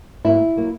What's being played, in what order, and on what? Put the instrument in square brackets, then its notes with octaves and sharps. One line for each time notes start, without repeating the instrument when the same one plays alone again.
[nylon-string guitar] G#2 F#3 A#3 E4
F#3 A#3